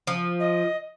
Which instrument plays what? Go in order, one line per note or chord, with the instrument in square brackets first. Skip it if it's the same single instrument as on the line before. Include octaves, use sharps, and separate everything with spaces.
[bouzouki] F3
[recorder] D#5